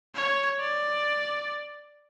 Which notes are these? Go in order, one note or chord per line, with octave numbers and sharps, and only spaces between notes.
C#5
D5